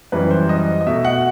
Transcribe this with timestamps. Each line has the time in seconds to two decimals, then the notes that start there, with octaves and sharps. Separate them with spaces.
0.12 F#2 E3 G3 B4
0.31 C5
0.49 D#5
0.81 D#5
0.87 B2 A3 E5
1.05 F#5